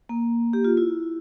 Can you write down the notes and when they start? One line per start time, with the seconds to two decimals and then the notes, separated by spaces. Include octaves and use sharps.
0.09 A#3
0.53 G4
0.64 F4
0.77 E4